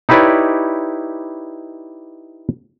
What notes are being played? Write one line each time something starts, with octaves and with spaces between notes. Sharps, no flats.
D#4 E4 G4 B4 C#5 D5